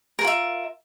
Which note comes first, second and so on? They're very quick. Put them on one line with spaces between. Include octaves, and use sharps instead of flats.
A#4 G#4 F4 E5